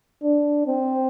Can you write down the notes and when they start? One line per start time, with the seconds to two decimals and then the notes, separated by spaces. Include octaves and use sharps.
0.23 D4
0.67 C4